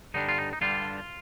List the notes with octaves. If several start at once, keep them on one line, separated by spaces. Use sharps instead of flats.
G2 D3 G3 D4 D#4
F4
D#4
D#4
G2 D3 G3 D4 F4